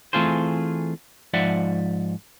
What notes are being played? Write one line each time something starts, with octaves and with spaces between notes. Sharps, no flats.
E3 A3 C4 F4 G#4 C5
G#2 F3 D5 E5 F#5